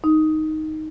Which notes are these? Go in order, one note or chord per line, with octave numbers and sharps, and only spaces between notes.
D#4